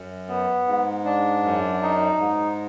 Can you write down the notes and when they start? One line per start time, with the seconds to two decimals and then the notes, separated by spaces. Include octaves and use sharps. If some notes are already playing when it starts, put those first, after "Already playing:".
Already playing: F#2
0.29 B3
0.67 G#2
1.05 D4
1.44 F#2
1.83 D#4
2.20 G#2